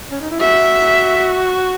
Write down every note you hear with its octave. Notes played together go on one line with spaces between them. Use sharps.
C#4
D#4
E4
F#4 E5